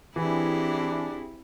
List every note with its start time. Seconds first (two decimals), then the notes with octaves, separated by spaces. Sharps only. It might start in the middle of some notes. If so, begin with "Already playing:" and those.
0.16 E3 C4 D4 E4 G4 G#4